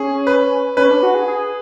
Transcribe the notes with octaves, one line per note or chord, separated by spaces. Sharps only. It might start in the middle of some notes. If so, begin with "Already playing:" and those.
Already playing: C#4 G#4
B4
C#4 B4
D4
F#4
G#4
G#4